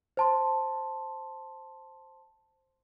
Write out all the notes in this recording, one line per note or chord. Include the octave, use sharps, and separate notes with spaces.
C5 A5 C6